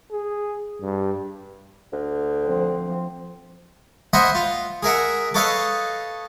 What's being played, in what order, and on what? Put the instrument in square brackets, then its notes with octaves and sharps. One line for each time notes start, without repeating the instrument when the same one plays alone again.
[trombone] G#4
G2
[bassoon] D2
[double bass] F3 C4
[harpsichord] C5 D#5 E5 F#5 G#5 B5
F4
G#4 A#4 E5 F#5
A4 B4 C#5 D#5 F5